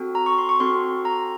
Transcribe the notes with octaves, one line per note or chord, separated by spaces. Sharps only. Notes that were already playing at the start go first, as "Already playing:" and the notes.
Already playing: C4 F#4 A4
A#5
C#6
C6
C#6
C4 F#4 A4 C6
A#5